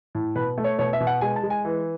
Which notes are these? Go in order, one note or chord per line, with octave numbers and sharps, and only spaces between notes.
A2
B2 B4
A3
C#5
B2 C#5
E5
B2
F#5
G#3 G#5
A5
G#3
G#5
E3